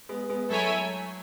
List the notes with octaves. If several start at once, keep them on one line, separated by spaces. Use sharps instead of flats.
G#3 B3
G#3 B3
F#3 A3 E4 A4 C#5 E5 G#5